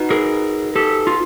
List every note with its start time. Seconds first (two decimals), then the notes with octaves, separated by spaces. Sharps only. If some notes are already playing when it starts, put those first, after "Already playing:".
Already playing: D#4 F#4 B4
0.10 G#4 A#4
0.76 G4 A4
1.07 F4